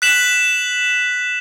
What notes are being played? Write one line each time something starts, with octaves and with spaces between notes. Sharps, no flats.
F#6 B6 E7 F#7